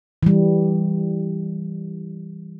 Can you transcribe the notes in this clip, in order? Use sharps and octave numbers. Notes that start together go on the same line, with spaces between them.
E3 G3